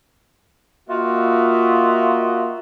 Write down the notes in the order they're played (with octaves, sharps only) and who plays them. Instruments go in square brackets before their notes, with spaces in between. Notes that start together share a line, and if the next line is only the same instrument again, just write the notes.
[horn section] A#3 F4 F#4 D#5 E5